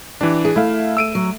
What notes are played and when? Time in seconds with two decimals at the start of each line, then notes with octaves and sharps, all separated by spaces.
0.21 E3 D4 G4
0.45 G#4
0.56 A3 E4 F5
0.97 E6 D7 D#7
1.15 F#3